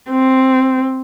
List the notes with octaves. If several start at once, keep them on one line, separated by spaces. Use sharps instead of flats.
C4